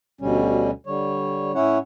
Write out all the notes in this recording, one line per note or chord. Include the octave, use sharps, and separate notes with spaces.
D2 B2 D3 G3 C#4
D3 G3 C#5
A2 C#4 E4 C#5 F#5